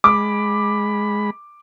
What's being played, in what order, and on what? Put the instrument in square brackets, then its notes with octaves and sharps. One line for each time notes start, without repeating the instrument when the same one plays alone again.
[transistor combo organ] G#3 B5 [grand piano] D6